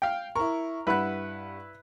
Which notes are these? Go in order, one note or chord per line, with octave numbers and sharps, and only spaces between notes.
F5 G5
E4 A#4 C#6
G2 E4 B4 F#5 B5 F#6